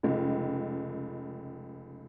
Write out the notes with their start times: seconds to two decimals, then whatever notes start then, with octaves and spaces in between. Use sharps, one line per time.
0.03 F1 C#2